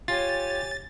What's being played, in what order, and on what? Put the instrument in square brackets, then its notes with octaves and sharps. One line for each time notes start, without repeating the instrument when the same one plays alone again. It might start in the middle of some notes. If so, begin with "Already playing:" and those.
[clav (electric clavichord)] F4 [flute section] G4 C#5 G#5 [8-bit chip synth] A6